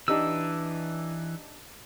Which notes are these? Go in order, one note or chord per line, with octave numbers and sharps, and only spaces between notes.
E3 D4 D#4 G4 E6